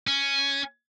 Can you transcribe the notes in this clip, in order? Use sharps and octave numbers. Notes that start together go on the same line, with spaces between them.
C#4